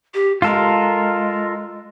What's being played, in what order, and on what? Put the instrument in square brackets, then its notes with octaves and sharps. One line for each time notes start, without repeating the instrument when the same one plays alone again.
[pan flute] G4
[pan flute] G#3 [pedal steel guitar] F4 A4 A#4